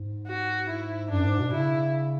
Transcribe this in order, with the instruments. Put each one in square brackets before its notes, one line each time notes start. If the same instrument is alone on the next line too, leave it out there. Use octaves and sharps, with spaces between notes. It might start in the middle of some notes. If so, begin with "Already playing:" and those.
Already playing: [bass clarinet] G#2
[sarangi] F#4
E4
[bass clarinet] F#2 [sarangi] D4
[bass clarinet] G#2
B2
[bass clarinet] C#3 [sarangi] E4